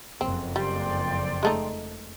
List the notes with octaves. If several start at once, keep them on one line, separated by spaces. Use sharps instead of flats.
F#1 F2 C4
G3 D5 G5 C6
G#3 A3 D#4